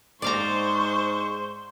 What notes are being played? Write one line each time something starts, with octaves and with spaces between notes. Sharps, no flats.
G#2 C5 D5 F5 A#5 C#6